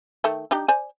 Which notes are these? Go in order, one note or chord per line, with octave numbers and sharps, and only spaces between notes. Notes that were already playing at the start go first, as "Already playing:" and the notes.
D#3 A3
D4 D#4 G4
C5 D5 G#5